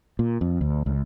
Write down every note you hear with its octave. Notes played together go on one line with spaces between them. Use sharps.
A#2
F2
D2
C#2